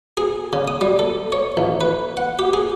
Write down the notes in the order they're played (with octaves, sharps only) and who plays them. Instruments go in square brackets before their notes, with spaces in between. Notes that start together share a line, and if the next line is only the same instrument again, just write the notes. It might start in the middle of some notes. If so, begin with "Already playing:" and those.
[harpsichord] G#4
C#3
D#6
G3
A4
C#5
A1
B4
F#5
G4
G#4